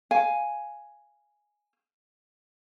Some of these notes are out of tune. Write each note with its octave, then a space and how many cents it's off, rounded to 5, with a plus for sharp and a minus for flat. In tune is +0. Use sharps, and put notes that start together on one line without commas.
F5 +0 G#5 +0